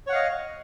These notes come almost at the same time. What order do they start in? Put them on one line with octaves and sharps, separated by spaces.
C#5 F#5 F5 D#5